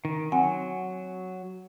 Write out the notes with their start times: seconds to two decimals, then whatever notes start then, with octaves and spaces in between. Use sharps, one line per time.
0.05 D#3
0.32 F#3 C4 F#5 G#5